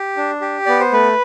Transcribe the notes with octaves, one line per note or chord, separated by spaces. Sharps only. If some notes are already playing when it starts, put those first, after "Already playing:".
Already playing: G4
D4
G4
B3 D5
C5
A3 B4